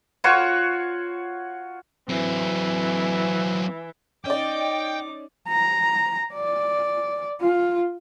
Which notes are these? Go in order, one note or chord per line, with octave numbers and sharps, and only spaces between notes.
F4 F#4 C#5 C#6
E3 F#3 C4
C#4 D#4 D5 D#5 G5 D6
A#5
D5
F4